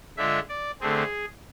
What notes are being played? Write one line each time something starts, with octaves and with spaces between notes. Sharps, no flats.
D3 G#3 D4 F4 E5
D5
D3 A3 C4 G#4